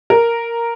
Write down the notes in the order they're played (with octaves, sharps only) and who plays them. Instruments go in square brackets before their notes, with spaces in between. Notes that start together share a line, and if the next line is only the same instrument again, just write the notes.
[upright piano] A#4